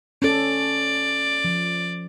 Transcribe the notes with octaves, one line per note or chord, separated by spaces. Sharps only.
C#4 A4 D5
F3